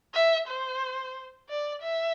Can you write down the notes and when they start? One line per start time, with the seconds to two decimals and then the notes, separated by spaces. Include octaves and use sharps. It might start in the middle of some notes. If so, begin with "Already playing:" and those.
0.14 E5
0.48 C5
1.49 D5
1.82 E5